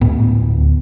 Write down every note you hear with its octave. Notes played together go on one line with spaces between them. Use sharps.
D1 D2 A2 B3